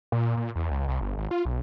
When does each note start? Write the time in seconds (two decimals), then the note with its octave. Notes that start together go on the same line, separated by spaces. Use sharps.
0.12 A#2
0.37 A#2
0.56 E2
0.71 C#2
0.88 C2
1.01 G1
1.17 G#1
1.31 F4
1.45 B1